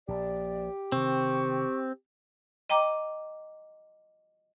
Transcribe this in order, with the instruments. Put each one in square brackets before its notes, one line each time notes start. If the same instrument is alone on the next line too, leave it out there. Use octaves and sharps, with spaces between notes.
[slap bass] A#1 [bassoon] G4 [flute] D5
[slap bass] C3 D#3 [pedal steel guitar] C4 [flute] C#6
[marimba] D#5 G5 A#5 D6